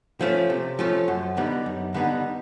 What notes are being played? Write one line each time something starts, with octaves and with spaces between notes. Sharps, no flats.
F3 A3 C#4 F4
C3
F3 A3 C#4 F4
F#2
D3 G3 B3 D#4
F#2
D3 G3 B3 D#4